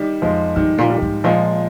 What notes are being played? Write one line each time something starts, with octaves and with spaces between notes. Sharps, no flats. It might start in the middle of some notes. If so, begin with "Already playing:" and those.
Already playing: D#3 G3
F2 F3 G#3
G2 D#3 G3
A#2
D#3 G3
G#2
A#2 F3 G#3